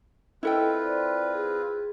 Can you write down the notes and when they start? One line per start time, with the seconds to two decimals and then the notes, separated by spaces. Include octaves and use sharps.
0.43 C4 E4 F4 A4 B4 D#5 G5
0.82 C5 D5
1.34 G#4